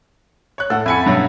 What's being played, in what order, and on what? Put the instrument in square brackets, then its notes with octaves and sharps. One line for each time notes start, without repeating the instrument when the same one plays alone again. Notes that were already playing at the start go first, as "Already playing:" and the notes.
[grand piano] C#5 F#6
[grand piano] A2 [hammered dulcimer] A4 F#5
[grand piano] F2 G#5 C#7 [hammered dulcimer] E4 B5
[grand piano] G2 B2 F#3